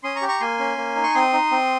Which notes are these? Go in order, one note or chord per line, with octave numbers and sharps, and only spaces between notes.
C#4 C6 D#6
A#5 C#6
G4
A#5 C#6
A#3 G#5 C6
C#4
A#3
D#4
C#6
C4 C6 D#6
D#4
C4